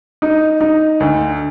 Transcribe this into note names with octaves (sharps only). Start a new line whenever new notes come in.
D#4
D#4
D2